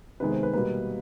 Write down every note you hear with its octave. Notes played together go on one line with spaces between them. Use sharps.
C3 D#3 G#3 B3 B4
C5
B4
B2 G3 A#3 B4